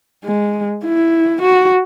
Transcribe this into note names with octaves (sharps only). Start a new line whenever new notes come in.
G#3
E4
F#4